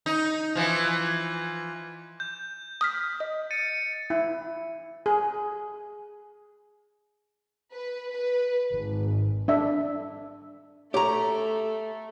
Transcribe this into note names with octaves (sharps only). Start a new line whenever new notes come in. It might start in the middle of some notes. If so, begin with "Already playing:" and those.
D#4
E3 F3
G6
D#6 F6 B6
D#5
A6 C#7 D#7
E4
G#4
B4
B4
G#1
D4 E5
A3 G4 C#5 A#5